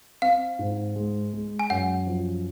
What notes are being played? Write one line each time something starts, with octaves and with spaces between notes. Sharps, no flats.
C4 F5
G#2
G#3
G#3
G#5
F#2 F#5
F3